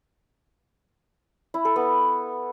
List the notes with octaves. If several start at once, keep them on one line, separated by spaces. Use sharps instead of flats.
E4
A4
B3